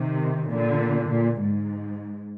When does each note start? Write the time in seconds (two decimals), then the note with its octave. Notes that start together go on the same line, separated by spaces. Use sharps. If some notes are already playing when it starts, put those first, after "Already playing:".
Already playing: C3 D#3
0.49 A#2 D3
1.09 A#2
1.40 G#2